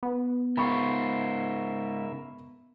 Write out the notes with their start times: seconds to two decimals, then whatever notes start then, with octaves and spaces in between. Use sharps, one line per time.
0.03 B3
0.57 G#2 C#3 F4 A#4 E5 B5 C#6